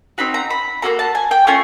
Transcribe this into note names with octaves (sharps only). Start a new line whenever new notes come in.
C4 D#4 F#4 B5
A#5
B5
A#3 C#4 F#4 A4 A#5
A5
G#5
G5
A3 C#4 F4 G#5